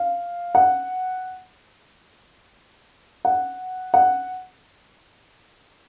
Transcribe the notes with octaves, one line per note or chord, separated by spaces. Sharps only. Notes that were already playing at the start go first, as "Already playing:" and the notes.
Already playing: F5
F#5
F#5
F#5